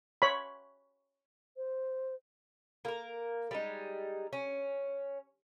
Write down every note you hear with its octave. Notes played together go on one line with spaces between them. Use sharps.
C#5 B5
C5
A#3 A#4
G3 G#3 D#4
C#4